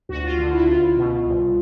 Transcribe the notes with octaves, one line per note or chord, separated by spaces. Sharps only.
D2 F#4
F4
D3 F4
E4
C#2 F4
B2
C2